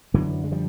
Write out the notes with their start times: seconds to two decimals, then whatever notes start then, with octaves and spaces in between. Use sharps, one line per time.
0.14 F#2 D3 E3 F#3
0.44 G#3
0.52 F3 G3